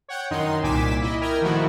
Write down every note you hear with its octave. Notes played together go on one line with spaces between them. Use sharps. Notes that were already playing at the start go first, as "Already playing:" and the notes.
C#5 F#5 G5
F#2 D#3 D#4 C6
C2 A#2 G#5 D6 B6 E7
E4 D#5
A#4 D#5 G5 F6 G#6
D#3 F3 A3 E4 F#4